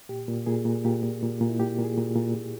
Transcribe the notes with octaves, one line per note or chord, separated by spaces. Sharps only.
A#2 G4
A#2
A#2 G#4
A#2
A#2 G4
A#2
A#2
A#2
E4
A#2 G4
A#2
G#4
A#2
A#2
A#2